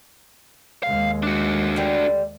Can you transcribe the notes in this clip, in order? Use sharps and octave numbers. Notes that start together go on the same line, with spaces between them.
D#2 G#3 F5
D4 F#4
D3 G3